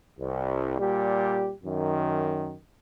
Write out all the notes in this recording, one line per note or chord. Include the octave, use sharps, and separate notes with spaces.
C2
A#2 G3 G4
F#2 D#3